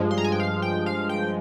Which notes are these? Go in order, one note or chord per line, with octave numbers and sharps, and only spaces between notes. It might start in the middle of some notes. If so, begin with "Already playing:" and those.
Already playing: G2 F3 G#3
C6
A#5
G#5
G5
F5
G5
F5
G5